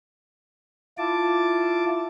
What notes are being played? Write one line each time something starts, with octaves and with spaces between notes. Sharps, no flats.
E4 F4 A5 D6